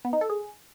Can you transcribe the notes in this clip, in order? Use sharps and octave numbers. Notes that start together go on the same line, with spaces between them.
B3
D#4
A4
G#4